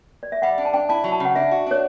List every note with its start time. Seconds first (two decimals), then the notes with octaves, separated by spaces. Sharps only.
0.23 D5
0.32 E5
0.42 G3 F#5
0.58 D4
0.65 A5
0.73 D4 G5
0.89 E4 A5
1.04 F#3
1.12 A5
1.20 C#3
1.25 F#5
1.35 D4 E5
1.51 F#4
1.67 D4 C#5